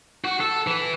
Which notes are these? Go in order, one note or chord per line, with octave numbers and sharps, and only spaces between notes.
F#4
A4
E3